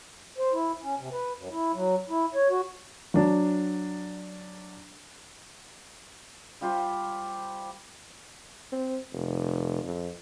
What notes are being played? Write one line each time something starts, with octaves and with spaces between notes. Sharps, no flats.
C5
E4
C#4
C3
B4
F#2
E4
F#3
E4
C#5
F#4
F#3 D4
G3 F4 G4 C5
C4
F1
F2